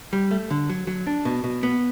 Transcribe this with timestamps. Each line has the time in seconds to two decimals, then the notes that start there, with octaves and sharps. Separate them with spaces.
0.13 G3
0.31 A3
0.51 D3
0.70 F#3
0.87 F#3
1.07 D4
1.25 B2
1.44 B2
1.63 B3